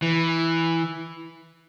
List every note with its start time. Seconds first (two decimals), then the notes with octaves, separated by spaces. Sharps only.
0.02 E3